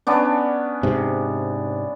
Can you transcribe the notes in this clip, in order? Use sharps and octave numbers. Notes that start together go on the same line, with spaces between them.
B3 C#4 D4
G#2 C3